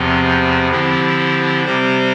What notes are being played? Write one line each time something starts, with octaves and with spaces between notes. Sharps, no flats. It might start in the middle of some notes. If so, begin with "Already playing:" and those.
Already playing: E2 C3 F3 C4
D3 F3 C4 E4 G4
C3 G3 C4 G4 C5